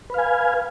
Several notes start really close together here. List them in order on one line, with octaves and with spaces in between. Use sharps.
B4 F5 G#5